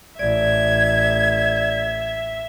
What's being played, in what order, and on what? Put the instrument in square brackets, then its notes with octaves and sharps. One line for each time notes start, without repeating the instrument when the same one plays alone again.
[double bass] A1 [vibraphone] D5 [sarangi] E5 [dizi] G#6